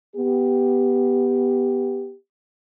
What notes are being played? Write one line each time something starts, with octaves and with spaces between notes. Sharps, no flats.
B3 G4